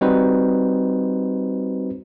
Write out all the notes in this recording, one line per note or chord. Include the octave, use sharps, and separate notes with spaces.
G3 C4 D#4 F#4 B4 C5